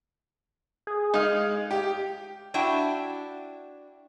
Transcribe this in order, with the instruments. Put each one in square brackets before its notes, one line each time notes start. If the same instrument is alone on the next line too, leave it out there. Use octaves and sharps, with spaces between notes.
[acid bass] G#4
[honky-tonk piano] G#3 [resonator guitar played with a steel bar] D#4 F5
[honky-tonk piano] G4
[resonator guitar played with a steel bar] D4 E4 F#4 E5 G5